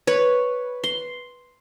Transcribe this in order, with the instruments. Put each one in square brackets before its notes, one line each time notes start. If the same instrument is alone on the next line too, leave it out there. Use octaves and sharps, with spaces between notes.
[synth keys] B4 [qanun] C#5
[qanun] C6